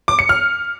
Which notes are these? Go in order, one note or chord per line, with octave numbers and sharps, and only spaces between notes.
D6
C#7
F6